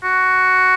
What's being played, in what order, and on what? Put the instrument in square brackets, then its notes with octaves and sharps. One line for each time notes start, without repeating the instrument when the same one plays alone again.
[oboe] F#4